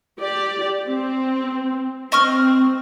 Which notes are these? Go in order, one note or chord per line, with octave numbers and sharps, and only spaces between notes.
G4 D5
C4
C4 D#5 C#6 F6